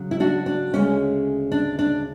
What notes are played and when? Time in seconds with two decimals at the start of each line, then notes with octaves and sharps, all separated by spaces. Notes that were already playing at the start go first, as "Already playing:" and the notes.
Already playing: C#3 F#3
0.11 E4
0.20 D4 F#4
0.46 D4
0.73 D2 C#3 G#3 C#4
1.52 D4
1.79 D4